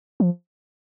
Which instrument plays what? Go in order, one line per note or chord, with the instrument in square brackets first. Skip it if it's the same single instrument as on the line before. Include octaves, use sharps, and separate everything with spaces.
[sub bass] F3